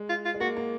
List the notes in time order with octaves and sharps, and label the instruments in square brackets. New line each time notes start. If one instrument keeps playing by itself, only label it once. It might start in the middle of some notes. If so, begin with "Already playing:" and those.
Already playing: [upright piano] G#3
[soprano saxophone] F4
F4
[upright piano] G#3
[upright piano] A#3 [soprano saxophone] F#4
[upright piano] A#3